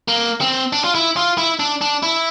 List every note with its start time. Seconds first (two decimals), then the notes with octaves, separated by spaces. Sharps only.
0.08 A#3
0.41 C4
0.73 D4
0.84 F4
0.95 E4
1.17 F4
1.38 E4
1.59 D4
1.81 D4
2.03 E4